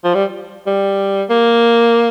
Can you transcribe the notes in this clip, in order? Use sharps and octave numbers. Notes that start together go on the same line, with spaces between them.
F3
G3
G3
A#3